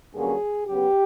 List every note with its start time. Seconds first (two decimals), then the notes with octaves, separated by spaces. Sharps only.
0.14 G2 D3 F#3 A#3 C#4 G#4
0.67 C#3 F#3 B3 G4